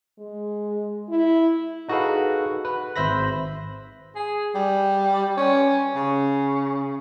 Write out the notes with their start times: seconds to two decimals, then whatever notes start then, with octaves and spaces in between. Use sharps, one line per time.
0.19 G#3
1.09 E4
1.88 D#4 F#4 G#4 A4 B4 F5
2.65 B4
2.96 G#1 C5 E5 B5 A#6
4.15 G#4
4.55 G3
5.37 C#4
5.95 C#3